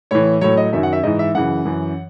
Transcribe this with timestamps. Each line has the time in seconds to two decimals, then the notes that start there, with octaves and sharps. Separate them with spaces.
0.11 A2 E3 C#5
0.41 A2 F#3 C#5
0.57 D#5
0.73 F#2 D#3 F#3 E5
0.83 F#5
0.93 E5
1.03 G#2 E3 D#5
1.19 E5
1.35 F#2 C#3 E3 F#5
1.65 F#2 E3